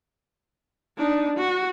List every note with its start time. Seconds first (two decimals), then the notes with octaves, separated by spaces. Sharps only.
0.97 D4 D#4
1.37 F#4